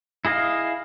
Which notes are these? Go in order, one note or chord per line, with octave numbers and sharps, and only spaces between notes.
E4 G#4 D#5 F5